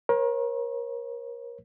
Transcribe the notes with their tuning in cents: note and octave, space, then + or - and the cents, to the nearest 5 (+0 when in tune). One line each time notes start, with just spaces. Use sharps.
A#4 +30 C#5 -40